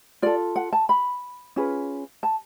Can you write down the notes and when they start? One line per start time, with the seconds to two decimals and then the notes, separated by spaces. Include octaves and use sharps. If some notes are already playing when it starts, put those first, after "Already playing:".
0.22 F4 A4 D5
0.56 F#5
0.73 A5
0.89 B5
1.56 C#4 F4 G#4 B4
2.23 A5